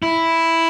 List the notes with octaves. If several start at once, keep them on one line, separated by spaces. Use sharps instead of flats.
E4